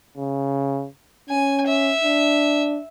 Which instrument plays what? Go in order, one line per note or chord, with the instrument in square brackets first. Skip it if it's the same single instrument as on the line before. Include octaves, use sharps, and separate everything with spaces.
[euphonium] C#3
[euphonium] C#4 [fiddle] G#5
[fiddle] E5
[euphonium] D4